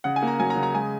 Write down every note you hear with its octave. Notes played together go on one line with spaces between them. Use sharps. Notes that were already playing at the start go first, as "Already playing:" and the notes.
C#3 F#5
G#5
A#3 A#5
F#3 G#5
A#5
C#3
A#5
G#3 G#5